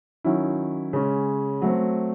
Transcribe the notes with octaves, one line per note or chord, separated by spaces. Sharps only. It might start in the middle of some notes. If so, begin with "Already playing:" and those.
D#3 F#3 C#4 E4
C#3 G#3 C#4
F#3 A3 C4